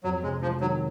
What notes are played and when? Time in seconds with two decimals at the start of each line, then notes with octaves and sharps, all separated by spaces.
0.04 F2 F#3
0.23 C3 G#3
0.42 F3 G#3
0.61 D#3 F#3